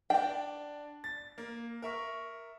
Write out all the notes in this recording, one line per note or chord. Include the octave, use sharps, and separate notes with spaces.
D4 D5 G5
A6
A#3
A#4 E5 C#6